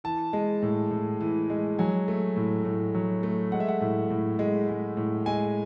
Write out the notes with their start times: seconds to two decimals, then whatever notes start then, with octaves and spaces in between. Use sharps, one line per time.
0.04 E3 A5
0.33 G#3
0.62 A2
0.91 A2
1.21 E3
1.50 G#3
1.79 F#3 G#5
2.08 A3
2.36 A2
2.65 A2
2.95 F#3
3.23 A3
3.52 G#3 F#5
3.60 E5
3.68 F#5
3.81 A2
4.10 A2
4.39 G#3
4.69 G#3
4.97 A2
5.26 G#3 G#5